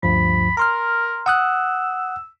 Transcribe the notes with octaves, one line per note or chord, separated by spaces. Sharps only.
D2 G2 F3 B5
A#4 A#5 C6 F6
F#5 D#6 E6 F#6